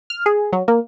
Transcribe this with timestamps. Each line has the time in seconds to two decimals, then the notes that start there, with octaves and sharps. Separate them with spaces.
0.10 F6
0.26 G#4
0.53 F#3
0.68 A#3